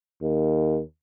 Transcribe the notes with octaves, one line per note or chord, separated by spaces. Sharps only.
D#2